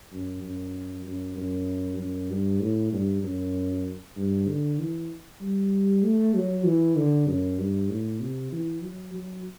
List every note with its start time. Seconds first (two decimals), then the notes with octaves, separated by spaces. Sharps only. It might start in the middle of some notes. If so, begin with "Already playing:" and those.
0.12 F#2
0.44 F#2
1.06 F#2
1.37 F#2
1.99 F#2
2.30 G2
2.62 A2
2.93 G2
3.23 F#2
4.17 G2
4.48 D3
4.79 E3
5.41 G3
6.03 A3
6.35 F#3
6.66 E3
6.97 D3
7.28 F#2
7.59 G2
7.90 A2
8.21 C3
8.52 E3
8.83 F#3
9.15 F#3